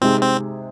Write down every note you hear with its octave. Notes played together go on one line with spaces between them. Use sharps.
C3 G#3 C4 D#4 G#4
C4